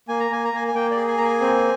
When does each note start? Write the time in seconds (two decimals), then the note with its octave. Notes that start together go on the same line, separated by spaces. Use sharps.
0.08 A#3 G#5
0.20 A#5
0.30 A#3 G#5
0.44 A#5
0.53 A#3 G#5
0.68 G#5
0.75 A#3 G5
0.91 D5
0.97 G#4
1.08 G#5
1.17 A#3 A#5
1.24 G#5
1.41 C4